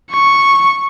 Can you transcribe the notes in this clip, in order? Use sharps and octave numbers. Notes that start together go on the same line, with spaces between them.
C#6